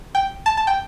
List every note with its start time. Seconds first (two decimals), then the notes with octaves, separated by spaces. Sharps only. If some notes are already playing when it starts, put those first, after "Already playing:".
0.15 G5
0.46 A5
0.57 A5
0.67 G5